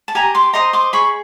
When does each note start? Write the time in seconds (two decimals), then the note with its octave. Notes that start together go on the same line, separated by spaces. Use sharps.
0.08 A5
0.15 G4 G#5 A#5
0.35 C6 D6
0.53 C5 D#5 A#5 C6
0.73 C6 D6
0.93 G#4 B5 C#6